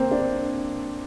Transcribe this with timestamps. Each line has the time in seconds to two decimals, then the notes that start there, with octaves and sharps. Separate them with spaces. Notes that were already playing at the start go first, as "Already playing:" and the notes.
Already playing: A#3 C4
0.11 D4